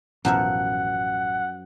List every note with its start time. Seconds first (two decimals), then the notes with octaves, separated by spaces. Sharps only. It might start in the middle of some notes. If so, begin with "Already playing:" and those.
0.25 A1 F#2 B2 F3 E5 F#5